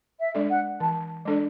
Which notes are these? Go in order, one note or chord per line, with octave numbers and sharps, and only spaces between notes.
E5
G#3 D4 A4 D5
F#5
E3 A5
G#3 D4 A4 D5